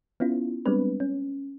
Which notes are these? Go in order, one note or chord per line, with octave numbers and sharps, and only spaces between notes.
B3 C#4 E4 F4
G3 G#3 B3 C4 D4 B4
C#4